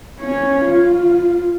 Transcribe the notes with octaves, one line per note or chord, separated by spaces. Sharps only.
C#4 C#5
F4